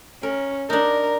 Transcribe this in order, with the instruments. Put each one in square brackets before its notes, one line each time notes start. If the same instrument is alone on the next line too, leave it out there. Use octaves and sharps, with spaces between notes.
[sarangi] C#4 [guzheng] A#4
[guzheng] D4 D#4 [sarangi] A#4